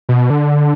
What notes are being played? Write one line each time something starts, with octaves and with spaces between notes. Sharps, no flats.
B2
D3